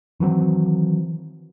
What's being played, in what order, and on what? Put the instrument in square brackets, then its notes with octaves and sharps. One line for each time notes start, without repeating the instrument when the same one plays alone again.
[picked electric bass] D#3 E3 F#3 C4